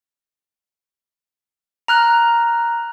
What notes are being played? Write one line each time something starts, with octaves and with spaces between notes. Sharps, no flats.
A#5 F6 F#6